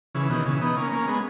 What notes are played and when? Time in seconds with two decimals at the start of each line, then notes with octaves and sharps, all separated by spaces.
0.15 C#3 E3
0.30 B2 D#3
0.46 C#3 E3
0.61 B3 D#4
0.77 A#3 C#4
0.92 A#3 C#4
1.08 G#3 B3